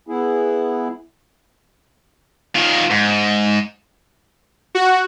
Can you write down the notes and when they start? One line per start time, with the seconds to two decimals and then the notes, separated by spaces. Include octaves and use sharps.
0.08 B3 E4 G#4
2.55 D#3 F4
2.90 G#2
4.75 F#4